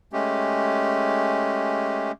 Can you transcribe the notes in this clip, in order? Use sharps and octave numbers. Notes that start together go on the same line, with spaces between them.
G#3 A3 C#4 G4